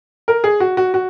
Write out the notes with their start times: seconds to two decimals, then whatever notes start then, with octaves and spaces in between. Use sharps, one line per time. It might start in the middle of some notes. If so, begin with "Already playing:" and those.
0.28 A#4
0.44 G#4
0.60 F#4
0.77 F#4
0.94 F#4